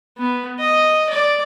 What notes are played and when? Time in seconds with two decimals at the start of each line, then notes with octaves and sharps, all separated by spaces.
0.18 B3
0.59 D#5
1.10 D5